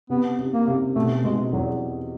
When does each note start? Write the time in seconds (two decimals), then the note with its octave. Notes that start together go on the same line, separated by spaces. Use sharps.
0.10 C3 B3
0.39 C3
0.53 A#3
0.67 C3
0.95 B2 A3
1.24 B2 G#3
1.53 E2 F#3